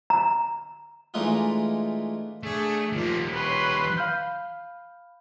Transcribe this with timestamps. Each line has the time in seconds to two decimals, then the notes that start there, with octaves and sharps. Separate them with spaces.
0.10 A#5
1.14 E3 G#3 A3 D4 D#4 F4
2.43 A3 D4 G#4
2.93 D#3 F3 G3 A#3
3.34 B4 C#5 C6
3.97 F5 B5 F6 G6